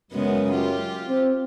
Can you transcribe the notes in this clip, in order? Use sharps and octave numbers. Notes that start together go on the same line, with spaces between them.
F#2 C#3 G#3 B3
F4 G4
C4